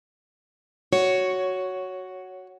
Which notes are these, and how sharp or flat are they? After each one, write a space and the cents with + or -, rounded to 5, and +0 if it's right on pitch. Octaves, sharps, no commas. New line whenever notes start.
F#4 +5 C#5 +0